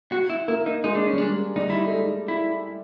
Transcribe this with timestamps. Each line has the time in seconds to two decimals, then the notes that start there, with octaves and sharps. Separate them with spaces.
0.12 F#4
0.30 E4
0.48 A#3 E4
0.66 D#4
0.84 G#3 D#4
0.95 D4
1.07 C#4
1.13 G3
1.18 G#3 D4
1.56 G3 D#4
1.70 E4
1.84 A3 D#4
1.92 G#3
2.28 E4